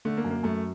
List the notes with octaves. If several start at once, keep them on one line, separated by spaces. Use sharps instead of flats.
D3 A3
A#3
F#2
A#3
F#2 A3